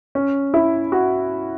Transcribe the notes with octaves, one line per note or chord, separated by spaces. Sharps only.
C#4
E4
F#4